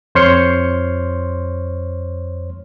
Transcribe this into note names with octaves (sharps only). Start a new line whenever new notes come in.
F2 C5 C#5 C6 F6 C#7